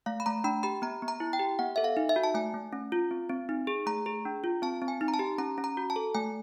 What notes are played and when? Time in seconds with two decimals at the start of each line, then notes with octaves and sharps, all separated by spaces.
0.06 A3 F5
0.20 B5
0.26 A3 A#5
0.44 D4 B5
0.63 G4 B5
0.82 B3 A#5
1.02 B3
1.08 A#5
1.20 E4
1.33 G5
1.39 G4
1.59 B3 F#5
1.76 A4 E5
1.84 F5
1.97 D#4
2.09 E5
2.16 F#4
2.24 A5
2.34 A3 G#5
2.54 A3
2.73 C#4
2.92 F4
3.11 C4
3.29 C4
3.49 D#4
3.67 G#4
3.86 A3 A#5
4.06 G#4
4.25 D4
4.44 F4
4.62 C4 A5
4.82 C4
4.88 G#5
5.01 D#4
5.08 A#5
5.14 A5
5.19 G4
5.38 C#4 A#5
5.58 C#4
5.64 A#5
5.77 F#4
5.90 A5
5.96 A4
6.15 A3 G#5